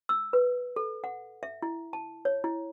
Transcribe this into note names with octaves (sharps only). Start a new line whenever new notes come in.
E6
B4
A4
F#5
E5
E4
A5
C#5
E4